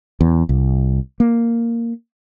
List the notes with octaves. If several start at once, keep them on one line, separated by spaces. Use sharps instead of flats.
E2
C2
A#3